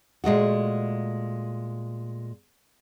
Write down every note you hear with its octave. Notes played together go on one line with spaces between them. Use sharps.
A#2 G#3 A3 F#4